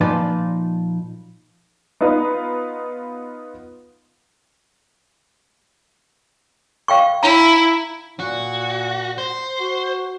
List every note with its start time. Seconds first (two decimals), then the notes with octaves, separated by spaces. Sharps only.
0.01 A#2 F3 D#4 B4 D5
2.01 B3 D#4 F4 B4
6.88 F5 G5 C#6
7.23 E4 A#5
8.20 A#2 F#4
9.18 C5
9.60 F#4